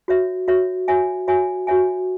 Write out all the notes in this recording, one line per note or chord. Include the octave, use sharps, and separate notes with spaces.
F#4 C#5 E5
F#4 C#5 E5
F#4 C#5 E5 G#5
F#4 C#5 E5 G#5
F#4 C#5 E5 G#5